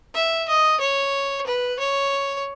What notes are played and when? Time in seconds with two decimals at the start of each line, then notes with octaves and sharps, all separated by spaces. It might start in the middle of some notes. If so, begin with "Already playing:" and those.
0.15 E5
0.48 D#5
0.80 C#5
1.46 B4
1.80 C#5